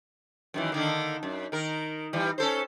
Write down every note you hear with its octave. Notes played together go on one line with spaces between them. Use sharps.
F#2 D#3 E3
D3 D#3 A#3
F#2
D#3 A#4
E3 G3
C#4 A4 C5